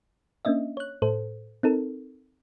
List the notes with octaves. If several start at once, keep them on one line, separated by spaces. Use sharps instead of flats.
A#3 C#4 D4 D#5 E5
C#5 F#6
A2 A4 C5
C4 D#4 A4 A#4